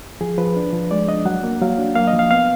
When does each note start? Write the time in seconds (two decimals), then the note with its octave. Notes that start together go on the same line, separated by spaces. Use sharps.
0.21 F3 G#4
0.38 F3 B4
0.57 D4
0.73 F3
0.91 G#3 D5
1.08 D4 D#5
1.25 F#3 F#5
1.44 A#3
1.62 F#3 F5
1.78 D4
1.95 A#3 F5
2.07 D#5
2.13 F3
2.19 F5
2.31 B3 F5